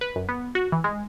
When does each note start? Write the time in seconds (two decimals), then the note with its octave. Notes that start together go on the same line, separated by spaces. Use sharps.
0.01 B4
0.16 F#2
0.29 B3
0.55 F#4
0.72 E3
0.84 G#3